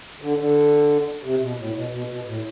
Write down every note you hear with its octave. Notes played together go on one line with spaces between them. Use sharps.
D3
D3
C3
B2
A2
B2
B2
B2
A2